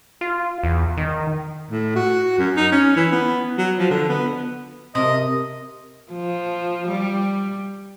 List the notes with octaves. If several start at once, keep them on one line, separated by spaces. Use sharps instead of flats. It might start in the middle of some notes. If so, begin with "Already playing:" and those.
F4
E2
D#3
A2
F#4
F#2
D#4
C#4
E3
B3
F#3
F3
D3
B3
C3 A#4 D#5
F3
G3